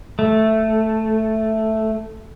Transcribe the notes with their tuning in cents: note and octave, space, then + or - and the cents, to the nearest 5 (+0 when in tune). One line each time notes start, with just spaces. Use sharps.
A3 +0